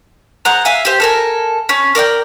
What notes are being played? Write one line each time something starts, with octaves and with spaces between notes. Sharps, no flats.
G#4 C5 F#5 A#5
E5 F5 G#5
G4 C5
A4 A#4 G#5
C#4
A#4 D5 E5 G5